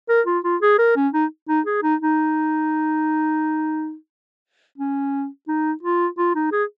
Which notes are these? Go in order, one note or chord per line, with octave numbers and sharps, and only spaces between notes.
A#4
F4
F4
G#4
A#4
C#4
D#4
D#4
G#4
D#4
D#4
C#4
D#4
F4
F4
D#4
G#4